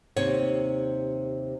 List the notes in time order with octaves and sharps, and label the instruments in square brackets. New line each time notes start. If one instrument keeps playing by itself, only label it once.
[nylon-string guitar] D#2 C3 C#5